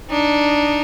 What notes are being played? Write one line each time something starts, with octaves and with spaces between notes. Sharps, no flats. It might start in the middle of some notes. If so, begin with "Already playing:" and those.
D4 D#4